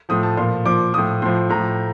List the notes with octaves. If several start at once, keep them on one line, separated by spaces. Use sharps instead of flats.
A2 F3 D#6
A5
A#2 F3 C6
A#2 F3 D6
A2 F3 D#6
A2 F3 C6
A2 F3 A#5